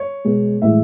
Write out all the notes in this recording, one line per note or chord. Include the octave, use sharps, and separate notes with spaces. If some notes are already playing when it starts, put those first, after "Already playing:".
Already playing: C#5
B2 G#3
A2 E3 G#3 E5